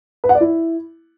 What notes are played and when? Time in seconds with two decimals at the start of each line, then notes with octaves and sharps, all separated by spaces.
0.24 B4
0.29 F#5
0.35 D5
0.40 E4